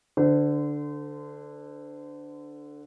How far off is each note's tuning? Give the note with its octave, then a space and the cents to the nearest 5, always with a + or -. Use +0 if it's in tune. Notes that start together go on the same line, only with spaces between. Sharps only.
D3 +0 C5 -35